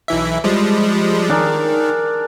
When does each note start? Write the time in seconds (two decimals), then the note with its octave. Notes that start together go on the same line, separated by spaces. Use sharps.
0.08 B1 E3 E5
0.44 F3 G3 G#3
1.30 D#3 D4 G#4 A#4